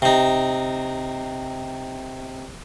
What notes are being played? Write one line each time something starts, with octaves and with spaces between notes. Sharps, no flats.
C3 D#4